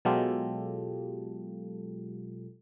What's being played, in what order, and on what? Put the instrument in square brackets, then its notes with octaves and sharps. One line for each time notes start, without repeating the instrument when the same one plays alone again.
[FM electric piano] B2 F#3 G#3 F4 G4 A4